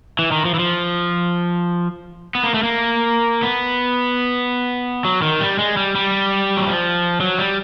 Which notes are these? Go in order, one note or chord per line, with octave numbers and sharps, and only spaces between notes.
E3
D#3
F3
E3
F3
B3
A#3
A3
A#3
B3
F#3
D#3
G3
G#3
G3
G3
F#3
F3
F#3
G3